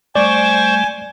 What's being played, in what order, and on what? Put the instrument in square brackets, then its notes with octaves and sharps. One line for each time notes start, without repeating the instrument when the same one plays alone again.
[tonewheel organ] G3 A3 [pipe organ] C5 C#6 [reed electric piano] D5 [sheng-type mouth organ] G#5